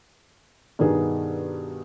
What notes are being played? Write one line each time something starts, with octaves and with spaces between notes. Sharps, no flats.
G2 B2 D#3 B3 D#4 G#4